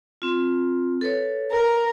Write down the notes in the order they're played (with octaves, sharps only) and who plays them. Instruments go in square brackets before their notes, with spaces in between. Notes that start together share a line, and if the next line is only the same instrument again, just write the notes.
[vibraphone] C4 F4
A4 B4 C#5
[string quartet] A#4